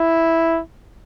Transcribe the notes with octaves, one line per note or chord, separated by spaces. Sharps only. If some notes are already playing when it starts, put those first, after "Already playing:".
Already playing: E4